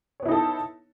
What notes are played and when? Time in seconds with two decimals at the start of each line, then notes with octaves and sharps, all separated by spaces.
0.20 C#5
0.23 B3
0.26 E4
0.28 D#4
0.31 A4